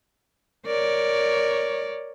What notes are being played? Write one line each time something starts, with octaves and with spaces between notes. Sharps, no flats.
A#4 C#5 D5